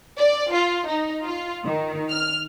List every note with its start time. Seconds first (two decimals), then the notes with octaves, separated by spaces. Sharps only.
0.19 D5
0.53 F4
0.88 D#4
1.26 F4
1.65 D#3
2.11 F6